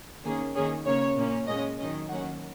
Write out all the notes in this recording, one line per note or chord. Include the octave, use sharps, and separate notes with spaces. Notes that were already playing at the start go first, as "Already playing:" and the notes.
D#3 A#3 C#4 G#4
D#3 A#3 C#4 G#4
C#3 A#3 C#4 C#5
A#2 A#3 C#4
A#2 G#3 C#4 D#5
D#3 F#3 C#4 D#5
D#3 F#3 A#3 C#4 F#5